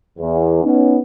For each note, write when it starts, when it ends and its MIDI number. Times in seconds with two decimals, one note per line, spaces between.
0.19 0.60 40
0.63 0.98 59
0.63 0.98 61
0.63 0.98 63